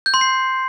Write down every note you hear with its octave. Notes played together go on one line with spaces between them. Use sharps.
G6
C6
C7